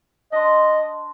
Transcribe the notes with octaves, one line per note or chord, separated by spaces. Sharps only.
D4 D#5 C6